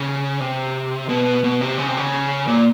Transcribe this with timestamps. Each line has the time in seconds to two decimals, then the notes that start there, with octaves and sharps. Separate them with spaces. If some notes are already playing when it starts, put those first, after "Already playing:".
Already playing: C#3
0.40 C3
1.09 B2
1.44 B2
1.61 C3
1.78 C#3
1.87 C3
1.97 C#3
2.47 A#2